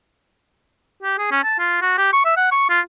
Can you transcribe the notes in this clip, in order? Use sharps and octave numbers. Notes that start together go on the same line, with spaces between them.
G4
G#4
C#4
A5
F4
F#4
G4
C#6
E5
F#5
C#6
F4